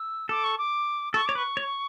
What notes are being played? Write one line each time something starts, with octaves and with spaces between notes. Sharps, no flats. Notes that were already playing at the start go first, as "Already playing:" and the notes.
Already playing: E6
A4 D6
C#6
D6
A4 C#6
C#5 D6
B4 C#6
C#5